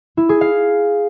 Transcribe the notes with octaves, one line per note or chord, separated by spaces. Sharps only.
E4
G#4
F5